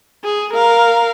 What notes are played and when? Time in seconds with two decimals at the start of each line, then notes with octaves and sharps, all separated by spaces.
0.24 G#4
0.53 A#4 F5